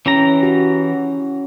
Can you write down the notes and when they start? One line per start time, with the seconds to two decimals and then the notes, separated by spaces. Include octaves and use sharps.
0.06 E3 C#4 G4 A#5
0.43 F#4